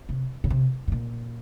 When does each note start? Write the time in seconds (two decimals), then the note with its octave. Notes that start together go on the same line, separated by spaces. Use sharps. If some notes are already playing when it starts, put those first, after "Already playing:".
0.09 C3
0.44 C#3
0.50 C3
0.88 A2
0.92 A#2